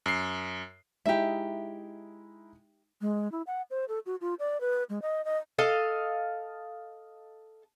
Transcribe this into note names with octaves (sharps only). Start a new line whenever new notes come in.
F#2 C7
G#3 D#4 E4 G4 E5
G#3
E4
F#5
C5
A4
F#4
F4
D5
B4
G#3
D#5
D#5
A4 D#5 F5